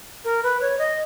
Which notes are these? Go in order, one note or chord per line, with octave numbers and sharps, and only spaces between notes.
A#4
B4
C#5
D#5